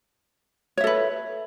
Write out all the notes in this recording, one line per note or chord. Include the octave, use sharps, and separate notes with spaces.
A4 B4 C#5 E5